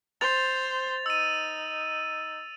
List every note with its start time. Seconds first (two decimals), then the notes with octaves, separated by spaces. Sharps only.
0.21 C5 A6 F7
1.06 D#4 E6 D#7